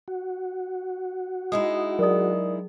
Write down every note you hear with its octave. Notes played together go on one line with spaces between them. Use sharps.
F#4
G#3 D#4 E4 D#6
F#3 G#4 A#4 D5 D#6